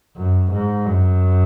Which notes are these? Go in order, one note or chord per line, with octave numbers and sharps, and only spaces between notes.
F#2
G#2
F#2